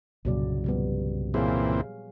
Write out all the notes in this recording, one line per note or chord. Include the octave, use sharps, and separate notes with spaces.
C2 G2 A#2 C#3 F#3 D5
F3 G3 B3
A#2 E3 C4 G#4 C#5 F5